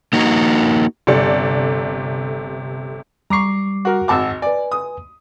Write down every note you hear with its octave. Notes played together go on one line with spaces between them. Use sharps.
A#3 D#4 F#4
G1 C3 A4 D5 C#7
G3 A#5 C#6 D6 C7
F#4 A#4
G#1 F#5 A5 D6 E6
B4 D5 G#5
D#6